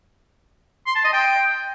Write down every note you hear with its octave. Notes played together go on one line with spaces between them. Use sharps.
C6
A5
D#5
G5